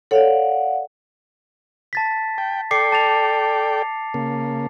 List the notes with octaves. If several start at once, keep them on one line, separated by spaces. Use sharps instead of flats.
A4 C#5 D5 F5 F#5
A5 A6 B6
G5
A4 D5 G5 D6 C7 C#7
A5 A6 F7
C#3 A#3